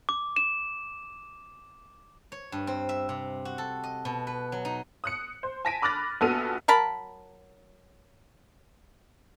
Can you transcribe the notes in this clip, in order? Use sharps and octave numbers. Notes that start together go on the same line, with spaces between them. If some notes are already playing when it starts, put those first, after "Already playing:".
D6
E7
C#5
G2
C4
E5
C3
F#4
A4
D#5
B2
B4
F#3
D#4
D#6 F#6 C#7
C5
G#5 A5 A#6 B6 D7 D#7
B5 D6 F6 F#6 A6 A#6
A#1 B3 F#4 A4 F6 D#7
F#3 A#4 A5 B5